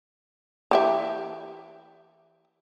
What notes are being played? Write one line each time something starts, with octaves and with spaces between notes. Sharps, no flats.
E3 G4 E5